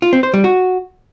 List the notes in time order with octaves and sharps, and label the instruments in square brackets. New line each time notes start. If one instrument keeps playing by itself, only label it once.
[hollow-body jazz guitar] F4
C4
C5
G3
F#4